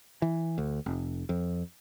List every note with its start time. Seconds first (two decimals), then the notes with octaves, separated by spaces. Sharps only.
0.22 E3
0.58 D2
0.86 F1
1.29 F2